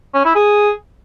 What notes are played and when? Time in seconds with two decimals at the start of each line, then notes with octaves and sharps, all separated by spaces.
0.14 C#4
0.25 E4
0.35 G#4